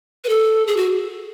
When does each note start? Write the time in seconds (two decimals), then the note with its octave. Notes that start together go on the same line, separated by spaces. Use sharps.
0.24 B4
0.29 A4
0.67 G#4
0.77 F#4